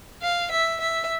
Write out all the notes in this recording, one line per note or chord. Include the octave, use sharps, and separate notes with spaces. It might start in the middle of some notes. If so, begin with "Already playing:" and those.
F5
E5
E5